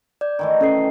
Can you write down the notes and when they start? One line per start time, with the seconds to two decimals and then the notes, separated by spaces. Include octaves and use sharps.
0.21 D5 G6
0.39 D#3 E3 A3
0.61 C#4 A4 C7